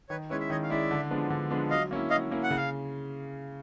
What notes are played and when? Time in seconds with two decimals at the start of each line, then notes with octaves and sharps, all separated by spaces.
0.09 D#3 B4 C#5
0.30 G#3 C#4 E4 B4 C#5
0.40 E5
0.50 D#3 C#5 D#5
0.63 F5
0.70 G#3 C#4 E4 D5 E5
0.91 D3
1.11 F3 G#3 B3 D4
1.30 D3
1.50 F3 G#3 B3 D4
1.70 F#3 D#5 F5
1.91 A#3 C#4 E4
2.10 F#3 D#5 F5
2.31 A#3 C#4 E4
2.44 F#5
2.50 C#3
2.57 F5